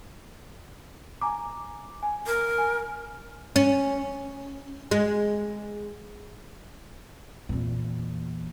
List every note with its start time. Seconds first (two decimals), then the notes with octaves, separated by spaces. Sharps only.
1.21 G#5 A#5 D6
2.03 G#5
2.26 A#4
2.58 G#5
3.56 C#4
4.91 G#3
7.49 E2 A#2